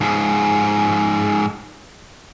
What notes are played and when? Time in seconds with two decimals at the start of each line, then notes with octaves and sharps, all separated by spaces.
0.01 G#2 F3